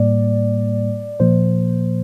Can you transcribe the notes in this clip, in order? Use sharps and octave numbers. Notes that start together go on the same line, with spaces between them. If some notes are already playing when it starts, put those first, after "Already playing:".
Already playing: A2 G3 A#3 D5
A#2 F3 A#3 C5